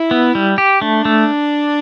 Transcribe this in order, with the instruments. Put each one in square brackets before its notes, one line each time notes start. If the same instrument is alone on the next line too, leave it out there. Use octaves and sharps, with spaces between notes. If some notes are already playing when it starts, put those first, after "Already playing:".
Already playing: [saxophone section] E4
[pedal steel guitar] B3
G3
G4
[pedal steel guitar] A3 [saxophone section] D4
[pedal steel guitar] A3